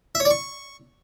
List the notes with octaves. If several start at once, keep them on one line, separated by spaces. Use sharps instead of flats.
E5
C#5
D5
C#6